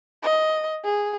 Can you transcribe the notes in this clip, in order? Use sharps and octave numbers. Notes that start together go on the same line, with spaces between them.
D#5
G#4